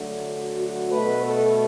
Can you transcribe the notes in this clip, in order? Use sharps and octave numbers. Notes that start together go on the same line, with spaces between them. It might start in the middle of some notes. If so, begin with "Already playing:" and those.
Already playing: D3 F#3 A3
F#4
F#4
B2 A3 B4
A4